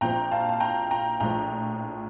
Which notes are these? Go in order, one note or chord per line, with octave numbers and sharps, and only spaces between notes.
A#1 A#2 F3 C4 G5 A#5
F5 A5
A5
G5 A#5
G5 A#5
A#1 A2 F3 G5 A#5